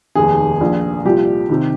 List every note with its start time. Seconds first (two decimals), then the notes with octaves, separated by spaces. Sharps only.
0.15 F1 D#2 D#3 G#4
0.61 A#1 A#2 F3
1.05 C2 A#2 F3 G4
1.49 C3 D#3